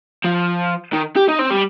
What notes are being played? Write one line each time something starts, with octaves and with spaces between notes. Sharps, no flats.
F3
D#3
G4
D#4
C4
G3